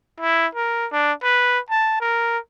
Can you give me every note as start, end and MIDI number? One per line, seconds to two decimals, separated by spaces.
0.20 0.47 64
0.55 0.87 70
0.92 1.12 62
1.23 1.59 71
1.70 1.96 81
2.01 2.38 70